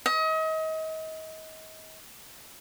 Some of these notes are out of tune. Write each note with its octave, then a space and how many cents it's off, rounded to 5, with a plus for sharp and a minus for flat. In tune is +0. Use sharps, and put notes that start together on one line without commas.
D#5 +35